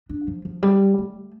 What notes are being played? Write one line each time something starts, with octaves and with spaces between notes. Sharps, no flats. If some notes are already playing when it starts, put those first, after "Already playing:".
D4
F3
F3
G3
A3